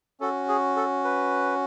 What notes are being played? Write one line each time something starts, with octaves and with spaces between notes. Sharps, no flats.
C#4 F#4 A4
G#4
A4
B4